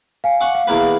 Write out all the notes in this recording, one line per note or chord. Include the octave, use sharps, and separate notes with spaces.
F5 G#5
F#5 C#6 D6
F5
E2 A#3 B4